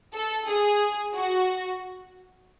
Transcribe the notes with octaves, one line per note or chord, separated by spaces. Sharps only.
A4
G#4
F#4